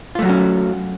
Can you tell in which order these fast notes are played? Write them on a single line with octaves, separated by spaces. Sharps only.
F4 A3 F#3 F#4 C#4